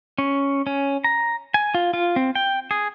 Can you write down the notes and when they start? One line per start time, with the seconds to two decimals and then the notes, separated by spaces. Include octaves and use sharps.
0.18 C#4
0.67 C#4
1.04 A#5
1.54 G#5
1.75 F4
1.94 F4
2.16 C4
2.35 G5
2.71 G#4